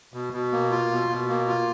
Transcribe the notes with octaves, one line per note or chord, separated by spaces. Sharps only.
B2
B2
A#3
F4
B2
B2
A#3
F4